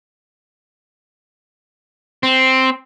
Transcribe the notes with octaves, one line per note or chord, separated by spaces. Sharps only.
C4